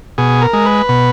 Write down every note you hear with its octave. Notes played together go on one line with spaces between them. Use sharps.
B2 G#4
A#4
G#3
B4
B2